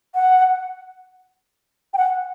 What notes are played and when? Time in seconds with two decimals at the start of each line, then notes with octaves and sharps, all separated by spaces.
0.15 F#5
1.94 G5
1.97 F#5